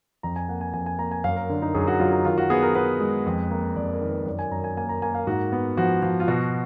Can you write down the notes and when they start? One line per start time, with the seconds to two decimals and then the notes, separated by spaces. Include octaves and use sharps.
0.23 F2 A#5
0.36 G#5
0.49 A#3 F#5
0.61 G#5
0.73 F2 G#5
0.86 G#5
0.98 A#3 A#5
1.11 G#5
1.24 F#2 F5
1.36 A#4
1.49 D3
1.62 D#4
1.74 F#2 G#4
1.87 F#4
2.00 F#3 F4
2.12 D#4
2.25 D#3 F4
2.38 F#4
2.50 B3 G#4
2.63 A#4
2.75 B3 B4
3.00 G#3
3.26 F2
3.51 A#3
3.76 F2 D5
3.92 A#4
4.01 D#3
4.10 B4
4.26 F#2 D5
4.39 G#5
4.51 F#2 A#5
4.64 G#5
4.77 A#3 G#5
4.89 A#5
5.02 A#3 G#5
5.15 F5
5.27 G#2 F#4
5.52 B3
5.77 F3 F#4
6.03 F3
6.20 F4
6.28 B2 F#4